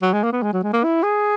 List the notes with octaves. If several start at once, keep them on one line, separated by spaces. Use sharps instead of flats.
F#3
G#3
A#3
B3
G#3
F#3
G#3
A#3
E4
G#4